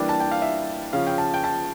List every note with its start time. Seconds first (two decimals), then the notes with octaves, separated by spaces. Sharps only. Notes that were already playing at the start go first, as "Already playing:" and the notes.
Already playing: E3 G3 A#3 D4
0.09 A5
0.20 G5
0.31 F5
0.42 E5
0.93 C#3 F3 C#4 F5
1.07 G5
1.18 A5
1.34 G5
1.44 A5